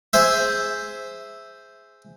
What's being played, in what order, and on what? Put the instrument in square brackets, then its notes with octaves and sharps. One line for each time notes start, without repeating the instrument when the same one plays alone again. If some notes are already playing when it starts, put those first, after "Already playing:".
[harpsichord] G#4 C5 E5